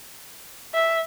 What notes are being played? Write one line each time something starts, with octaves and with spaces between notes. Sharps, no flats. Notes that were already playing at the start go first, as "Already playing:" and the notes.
E5